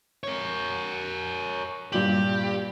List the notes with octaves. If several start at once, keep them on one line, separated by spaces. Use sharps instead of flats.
A#4 C#5
G2 A#2 G4 F#7